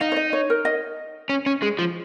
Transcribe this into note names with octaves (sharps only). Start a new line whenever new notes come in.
D#4 F5
C#5
D#5
C#5
A#4
D#5
C#4
C#4
G#3
F3